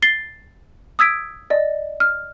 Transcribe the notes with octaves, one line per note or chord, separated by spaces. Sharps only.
A6 C7 G7
D#6 E6 G#6 B6 D7
D5 D#5
F6